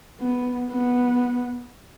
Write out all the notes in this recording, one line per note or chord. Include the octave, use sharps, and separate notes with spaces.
B3
B3